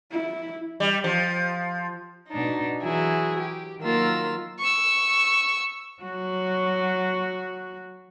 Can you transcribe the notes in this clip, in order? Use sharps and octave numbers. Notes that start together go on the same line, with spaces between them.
E4
G3
F3
B2 D4 D#4
E3 F#3 E4 G#4
G4
D#3 F#3 A#3 F4 E6
C#6 E6
F#3 F#4